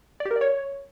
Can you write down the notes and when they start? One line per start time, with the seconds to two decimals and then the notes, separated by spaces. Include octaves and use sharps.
0.20 D5
0.25 G4
0.31 A#4
0.36 D5
0.41 C#5